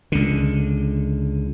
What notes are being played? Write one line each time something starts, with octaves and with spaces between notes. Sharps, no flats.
C#2 D3